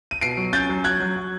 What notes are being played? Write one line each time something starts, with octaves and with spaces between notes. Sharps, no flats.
D#7
B2 C7 D7
F#3
C#4 G6 A6
F#3
F#3 F#6 G#6
F#3
F#3